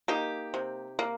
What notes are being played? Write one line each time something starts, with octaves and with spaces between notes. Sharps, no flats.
A#3 D#4 G4
C3
A#3